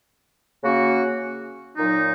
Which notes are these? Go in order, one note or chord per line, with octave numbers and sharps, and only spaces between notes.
C#3 A#3 C#4 F#4
A#2 F#3 D#4